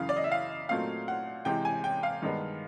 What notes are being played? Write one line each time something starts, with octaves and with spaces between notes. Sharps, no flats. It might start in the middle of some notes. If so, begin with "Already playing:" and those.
Already playing: F#2 C#3 E3 F5
D5
D#5
E5
F5
A#2 F#3 A3 C4 D#4 F5
F#5
C3 E3 G#3 G5
G#5
G5
F5
G2 D#3 G#3 B3